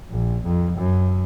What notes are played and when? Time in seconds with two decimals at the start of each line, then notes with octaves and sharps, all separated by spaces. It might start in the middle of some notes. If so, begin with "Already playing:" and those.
0.11 A#1
0.44 F2
0.78 F#2